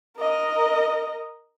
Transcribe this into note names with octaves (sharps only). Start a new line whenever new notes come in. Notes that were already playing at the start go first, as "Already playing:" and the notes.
A#4 D#5